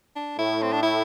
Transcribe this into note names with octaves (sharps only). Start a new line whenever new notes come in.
D4
A2 E4
C4
D4
E4